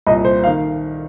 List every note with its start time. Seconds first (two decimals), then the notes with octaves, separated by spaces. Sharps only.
0.07 C2 A#2 D#5
0.25 C5
0.44 F5
0.47 D#3